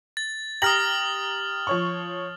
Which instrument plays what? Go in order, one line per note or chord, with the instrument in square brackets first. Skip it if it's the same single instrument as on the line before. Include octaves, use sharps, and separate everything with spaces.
[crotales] A6
[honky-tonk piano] G4 A#5 A#6 [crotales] D#6 F6 F#7
[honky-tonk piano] F3 C#5 C#6